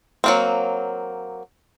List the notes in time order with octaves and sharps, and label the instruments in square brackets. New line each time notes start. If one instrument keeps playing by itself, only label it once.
[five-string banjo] F#3 A#3 C4